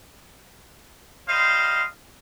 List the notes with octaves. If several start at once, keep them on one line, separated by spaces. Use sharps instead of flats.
G3 C5 D#5 F5